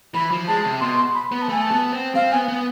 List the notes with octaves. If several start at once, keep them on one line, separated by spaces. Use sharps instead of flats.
E3 B5
F3
G#3 A5
C3
B2 C6
C6
B5
B3 B5
A5
A3 G#5
A5
B3
C4
C4 F5
B3 G#5
B3